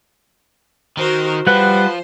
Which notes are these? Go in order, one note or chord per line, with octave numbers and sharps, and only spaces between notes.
D#3 F#4 A#4 C5
F3 G3 B4 C5 F#5